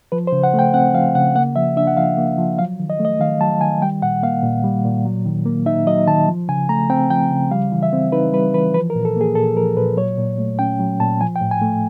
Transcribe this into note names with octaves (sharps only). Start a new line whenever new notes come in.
F3 B4
C5
C#3
F#5
A3
G5
C4 F#5
F3 F5
C#3 F#5
A#3 F#5
F3 E5
D4 E5
F#5
F3 F5
A#3
F3
F#3 F5
D#3
D#5
A3
D#5
D#3 F5
F#3 A5
D#3 G#5
G3 G5
A#2 F#5
A#3 F5
A#2
G3
A#2
F#3
D#3
A#3
D#4 E5
F#3 D#5
D#3 A5
F3
C#3 G#5
A3 A#5
C4 G5
F3 G5
C#3
G3 F5
E3
E5
C4
D#4 B4
G3 B4
E3 B4
F3 B4
A#4
A#2
A4
A#3 G#4
A#2 A4
F3 A#4
A#2 B4
F#3 C#5
A#2
A3
C#4 G5
F#3
A#2 A5
F3 G#5
G5
A2
G#5
A3